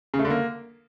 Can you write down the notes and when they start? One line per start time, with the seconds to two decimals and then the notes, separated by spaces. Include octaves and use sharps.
0.14 C#3
0.19 A3
0.25 D3
0.30 A#3